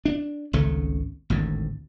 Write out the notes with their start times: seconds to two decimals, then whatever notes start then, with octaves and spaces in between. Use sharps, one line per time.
0.05 D4
0.53 G#1 C#2 C#3 A3
1.30 G#1 D2 A2